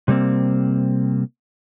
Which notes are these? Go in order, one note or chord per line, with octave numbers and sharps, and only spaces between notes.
C3 G3 A#3 C4